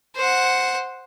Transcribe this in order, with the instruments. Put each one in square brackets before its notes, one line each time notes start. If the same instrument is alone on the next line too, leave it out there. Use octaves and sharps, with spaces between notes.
[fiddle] C5 F#5